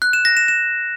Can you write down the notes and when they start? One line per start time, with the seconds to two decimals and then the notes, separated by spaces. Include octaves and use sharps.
0.02 F#6
0.13 E7
0.25 A#6
0.37 E7
0.48 E7